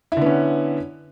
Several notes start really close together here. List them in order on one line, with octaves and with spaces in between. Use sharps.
E4 D3 B3 C#4